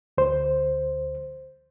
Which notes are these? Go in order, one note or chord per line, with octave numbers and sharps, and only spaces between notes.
D2 C5